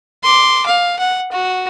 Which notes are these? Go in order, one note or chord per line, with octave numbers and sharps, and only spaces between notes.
C6 D6
F5
F#5
F#4